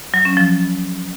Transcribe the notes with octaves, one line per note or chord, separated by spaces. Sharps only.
F#3
C#4
F3